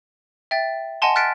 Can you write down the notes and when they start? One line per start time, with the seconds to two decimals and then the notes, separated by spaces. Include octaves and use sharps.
0.51 E5 G5 A6
1.02 D#5 F#5 G#5 A5 C6
1.16 F6 F#6 A6 B6 C#7 D7